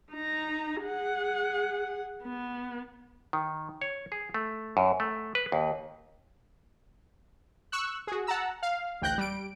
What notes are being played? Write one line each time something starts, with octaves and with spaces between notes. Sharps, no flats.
D#4 A#5
G#4 F#5
B3
D#3
C#5
G#4
A3
F#2
A3
B4
D#2
C#6 E6 F#6
F#4 G#4
F#5 A5 A#5 E6
F5
A1 D2 G5 F#6 G6 A#6
G3 D7